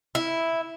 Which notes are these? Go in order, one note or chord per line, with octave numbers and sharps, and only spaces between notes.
E4